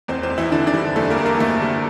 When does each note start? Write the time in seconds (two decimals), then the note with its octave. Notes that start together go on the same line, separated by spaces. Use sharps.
0.08 E2 C4
0.23 C4
0.30 E2
0.38 E3 E4
0.52 D3 D4
0.66 D3 D4
0.74 G3
0.96 E2 A3 A4
1.10 A#3 A#4
1.18 E2
1.25 A#3 A#4
1.39 D3 A3 A4
1.62 G3